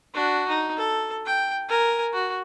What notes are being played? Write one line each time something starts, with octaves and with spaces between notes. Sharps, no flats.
D4 F#4
D#4
A4
G5
A#4 G#5
F#4